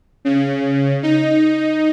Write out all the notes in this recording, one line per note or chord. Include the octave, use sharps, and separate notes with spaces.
C#3
D#4